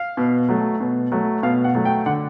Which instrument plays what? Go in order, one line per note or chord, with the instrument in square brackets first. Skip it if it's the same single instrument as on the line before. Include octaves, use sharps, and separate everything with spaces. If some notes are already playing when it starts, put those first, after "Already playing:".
Already playing: [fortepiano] F5
B2
F#3 A3
B2
F#3 A3
B2 F5
F#5
F#3 A3
G5
D3 F#5